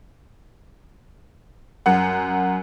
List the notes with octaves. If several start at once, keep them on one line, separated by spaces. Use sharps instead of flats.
F#2 F#5